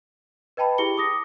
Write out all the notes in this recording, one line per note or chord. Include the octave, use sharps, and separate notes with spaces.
B4 D#5 G5 A5 B5
E4 G4 G#4 C#7 G7
D6 D#6 A#6